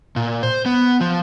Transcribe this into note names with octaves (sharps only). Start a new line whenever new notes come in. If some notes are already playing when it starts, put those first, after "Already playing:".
A#2
C5
B3
F3